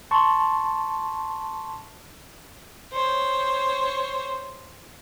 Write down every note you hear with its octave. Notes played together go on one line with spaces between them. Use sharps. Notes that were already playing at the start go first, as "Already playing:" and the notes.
A5 C6 C#6
C5 C#5